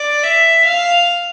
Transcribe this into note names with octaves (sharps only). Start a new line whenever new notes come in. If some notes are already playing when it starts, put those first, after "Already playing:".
Already playing: D5
E5
F5